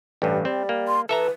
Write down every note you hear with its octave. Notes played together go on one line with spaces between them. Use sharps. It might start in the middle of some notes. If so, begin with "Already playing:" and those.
A1 G2 G3
G3 C4
A#3
C6
E3 A4 B4 E5 A#5